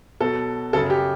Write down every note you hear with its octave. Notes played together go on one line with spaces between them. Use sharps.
B2 F#3 A4
F#2 C#3 F#3 A4
G4